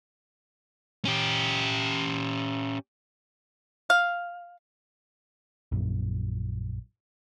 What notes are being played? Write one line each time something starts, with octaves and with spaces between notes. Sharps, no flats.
C#4 G4
F5
A#1 F#2